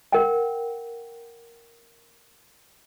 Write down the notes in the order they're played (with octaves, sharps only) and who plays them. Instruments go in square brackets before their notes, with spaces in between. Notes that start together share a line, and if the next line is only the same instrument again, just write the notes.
[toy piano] A#4 F#5 G5